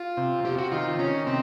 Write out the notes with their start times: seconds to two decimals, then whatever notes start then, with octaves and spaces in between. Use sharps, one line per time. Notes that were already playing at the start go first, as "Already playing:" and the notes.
Already playing: F4
0.17 C3
0.44 C3 G4
0.58 F#4
0.72 D#3 F4
0.99 D#3 C#4
1.27 C3 C4